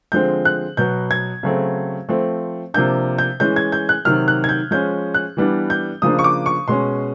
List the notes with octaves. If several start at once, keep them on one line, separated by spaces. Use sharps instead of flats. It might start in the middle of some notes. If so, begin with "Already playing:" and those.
D3 F3 G#3 C4 G6
F#6
B2 F#3 B3 G6
G#6
C#3 F#3 A3 C4
F3 A3 C4
C3 F3 A#3 D4 G6
G6
E3 G#3 C#4 G6
G#6
G6
F#6
C3 D#3 F#3 F6
F#6
G#6
G6
F3 G#3 C#4 G6
F#6
E3 G3 B3 D4
G6
C#3 F3 A#3 D4 D#6
C#6
D6
C#6
B2 G#3 C#4 C6